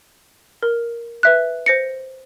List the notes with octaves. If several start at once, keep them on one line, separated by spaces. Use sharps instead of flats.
A#4
B4 E5 F#6
C5 A#6 C#7